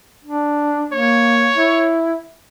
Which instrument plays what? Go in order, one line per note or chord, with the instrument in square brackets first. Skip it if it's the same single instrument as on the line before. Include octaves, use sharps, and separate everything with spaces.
[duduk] D4
[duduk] A#3 [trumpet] C#5
[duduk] E4